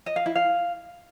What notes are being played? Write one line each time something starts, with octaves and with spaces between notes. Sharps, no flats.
D#5
F5
E4
F5